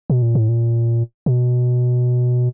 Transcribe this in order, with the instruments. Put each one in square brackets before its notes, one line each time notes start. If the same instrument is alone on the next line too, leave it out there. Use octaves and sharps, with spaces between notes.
[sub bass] B2
A#2
A2
A#2
B2